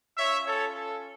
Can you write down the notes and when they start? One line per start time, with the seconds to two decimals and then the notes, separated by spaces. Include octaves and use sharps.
0.18 C#4 F4 C#5 E5
0.47 A4 C#5
0.76 A4